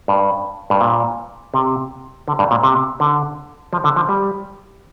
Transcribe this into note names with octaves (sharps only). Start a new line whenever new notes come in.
G2
G2
A#2
C3
D3
G2
A#2
C3
D3
F3
D3
F3
G3